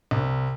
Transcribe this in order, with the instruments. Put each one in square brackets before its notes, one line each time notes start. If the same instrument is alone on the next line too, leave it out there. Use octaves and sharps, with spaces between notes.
[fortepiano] C2